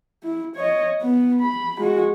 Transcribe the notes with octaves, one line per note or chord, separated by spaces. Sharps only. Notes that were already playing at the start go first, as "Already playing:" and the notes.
E4
C#5 D#5
B3
B5
G#3 F#4